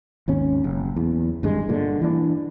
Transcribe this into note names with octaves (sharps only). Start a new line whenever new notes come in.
G#1 D#2 C#4
F#1
E2
G#1 G2 G#3
G2 A#2 D3
E3 D4